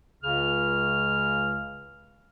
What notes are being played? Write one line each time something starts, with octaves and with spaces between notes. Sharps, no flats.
C#2 C#3 F6